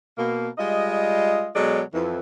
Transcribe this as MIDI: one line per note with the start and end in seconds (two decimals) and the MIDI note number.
0.17 0.48 47
0.17 0.48 58
0.58 1.49 55
0.58 1.49 56
0.58 1.49 65
0.58 1.49 75
1.55 1.82 47
1.55 1.82 54
1.55 1.82 56
1.55 1.82 69
1.55 1.82 73
1.55 1.82 74
1.94 2.20 41
1.94 2.20 52